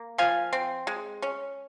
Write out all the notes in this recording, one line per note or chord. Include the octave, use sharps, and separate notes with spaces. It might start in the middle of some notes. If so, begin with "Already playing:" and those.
Already playing: A#3
F3 F5 G#5
C4
G#3
C#4